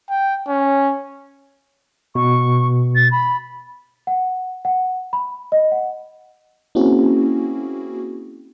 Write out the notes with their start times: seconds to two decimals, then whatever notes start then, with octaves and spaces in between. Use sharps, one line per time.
0.10 G5
0.48 C#4
2.15 B2 C#6
2.96 A6
3.12 B5
4.07 F#5
4.65 F#5
5.13 B5
5.52 D#5
5.72 F#5
6.75 A#3 C4 C#4 E4 F#4 G#4